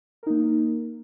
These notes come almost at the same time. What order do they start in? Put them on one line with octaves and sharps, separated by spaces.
A#4 D#4 A#3